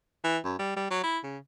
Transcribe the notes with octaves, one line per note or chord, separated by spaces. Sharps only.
E3
F#2
G3
G3
F#3
E4
C#3